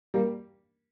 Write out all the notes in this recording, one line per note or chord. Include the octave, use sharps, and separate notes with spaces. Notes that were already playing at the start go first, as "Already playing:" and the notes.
G3 A#3